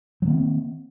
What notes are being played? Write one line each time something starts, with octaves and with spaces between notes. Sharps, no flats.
D#3 F#3 A#3 C4